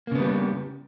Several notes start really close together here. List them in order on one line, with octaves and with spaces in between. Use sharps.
A#3 C#3 B3 G3